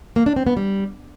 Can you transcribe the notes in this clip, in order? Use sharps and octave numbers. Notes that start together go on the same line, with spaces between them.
A#3
D4
C4
B3
G3